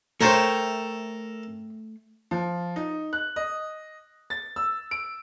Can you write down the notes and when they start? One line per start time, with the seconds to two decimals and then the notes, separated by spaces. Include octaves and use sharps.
0.21 A3 A4 A#4 C5 C#5 E5 G5
2.31 F3
2.76 D#4
3.13 F#6
3.36 D#5
4.30 A6
4.56 E6
4.91 D7